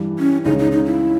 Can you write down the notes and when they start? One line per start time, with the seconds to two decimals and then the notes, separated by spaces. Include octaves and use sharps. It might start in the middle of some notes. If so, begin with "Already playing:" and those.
Already playing: G2 E3 G3
0.19 C#4
0.45 C#2 C#3 G#3 C#4 D#4
0.59 D#4
0.72 D#4
0.85 E4